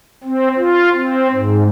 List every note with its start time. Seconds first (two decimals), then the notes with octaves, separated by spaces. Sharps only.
0.24 C4
0.57 F4
0.94 C4
1.32 G#2